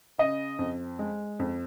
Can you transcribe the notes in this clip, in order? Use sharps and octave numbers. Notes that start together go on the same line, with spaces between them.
C#3 D#5
F2
G#3
F2